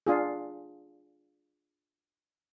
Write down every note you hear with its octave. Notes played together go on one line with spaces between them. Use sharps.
D4 F4 G#4